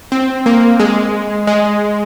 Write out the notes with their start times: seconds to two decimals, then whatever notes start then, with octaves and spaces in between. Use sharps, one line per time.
0.12 C4
0.46 A#3
0.80 G#3
1.47 G#3